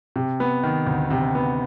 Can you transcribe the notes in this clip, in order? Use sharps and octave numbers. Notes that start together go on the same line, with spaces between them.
C3
B3
D#3
D2
C3
B3